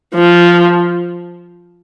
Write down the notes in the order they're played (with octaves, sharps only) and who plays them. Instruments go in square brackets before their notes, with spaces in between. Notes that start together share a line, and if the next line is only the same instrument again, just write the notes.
[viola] F3